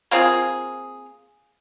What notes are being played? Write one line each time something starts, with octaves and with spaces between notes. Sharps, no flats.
A#3 C4 F4 G#4